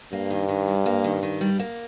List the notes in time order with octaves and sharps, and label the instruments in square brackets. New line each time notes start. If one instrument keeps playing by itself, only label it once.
[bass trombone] G2 [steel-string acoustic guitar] A#3
[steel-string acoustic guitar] D#3
D#3
G3
A#3
D#3
D#3
G3
A#3